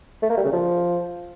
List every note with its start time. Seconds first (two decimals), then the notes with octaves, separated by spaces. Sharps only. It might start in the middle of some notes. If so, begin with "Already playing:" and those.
0.22 A3
0.30 A#3
0.37 G3
0.45 C#3
0.52 F3